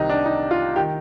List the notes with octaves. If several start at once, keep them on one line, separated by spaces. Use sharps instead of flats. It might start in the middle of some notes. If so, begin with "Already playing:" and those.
Already playing: C2 C3 D#3 D#4
D4
D#4
F4
D#3 G4